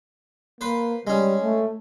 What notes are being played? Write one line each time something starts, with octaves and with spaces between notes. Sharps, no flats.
A#3 B4 C5
G3 G#3 C#4
A3